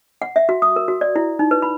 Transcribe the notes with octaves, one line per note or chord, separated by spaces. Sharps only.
F#5
E5
F#4
D#6
A#4
F#4
D5
E4
D#4
B4
B5